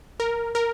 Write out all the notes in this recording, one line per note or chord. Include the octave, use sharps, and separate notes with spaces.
A#4
A#4